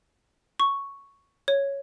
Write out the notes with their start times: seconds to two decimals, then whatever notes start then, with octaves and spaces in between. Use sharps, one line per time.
0.60 C#6
1.48 C#5